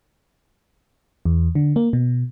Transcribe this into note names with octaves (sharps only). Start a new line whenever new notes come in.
E2
D3
A#3
B2